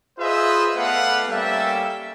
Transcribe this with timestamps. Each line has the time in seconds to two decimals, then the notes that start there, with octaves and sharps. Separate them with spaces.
0.19 F4 G#4 B4 C5 D#5 E5
0.76 A3 B3 B4 D5 F5 F#5
1.27 G3 A#3 C#4 A4 E5 G5